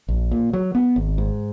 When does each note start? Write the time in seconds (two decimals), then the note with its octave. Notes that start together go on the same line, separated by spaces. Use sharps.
0.08 A#1
0.31 A#2
0.53 F#3
0.75 B3
0.96 G#1
1.18 G#2